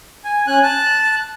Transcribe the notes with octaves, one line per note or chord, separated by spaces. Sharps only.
G#5
C#4 G#5 F#6
A5 F#6